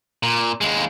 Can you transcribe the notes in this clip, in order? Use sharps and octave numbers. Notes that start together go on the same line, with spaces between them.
A#2
D#2 G#3